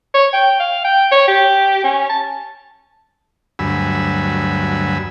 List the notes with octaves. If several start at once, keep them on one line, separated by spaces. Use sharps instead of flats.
C#5
G5
F5
G5
C#5
G4
C#4
A5
D2 G2 F#3 G#5 B5 E6